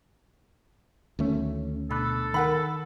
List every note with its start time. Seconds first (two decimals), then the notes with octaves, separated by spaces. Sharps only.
1.19 D2 D#3 A3 C#4
1.90 B2 D4 A4 B5 F#6
2.34 D#3 A#4 F#5 B5